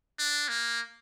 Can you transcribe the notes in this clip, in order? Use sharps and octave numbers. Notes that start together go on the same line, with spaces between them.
D4
A#3